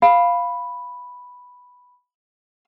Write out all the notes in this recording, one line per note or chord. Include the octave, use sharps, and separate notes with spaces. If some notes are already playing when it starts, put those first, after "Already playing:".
F5 B5